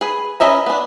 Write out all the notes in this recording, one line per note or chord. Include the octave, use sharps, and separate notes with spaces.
G#4 B4
C#4 B4 D#5 E5 A#5
B3 D4